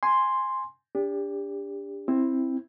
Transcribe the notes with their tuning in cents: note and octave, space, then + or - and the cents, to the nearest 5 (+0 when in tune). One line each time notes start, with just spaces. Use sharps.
G#5 +0 C6 +0
D4 -25 G4 +30
C4 +10 E4 +0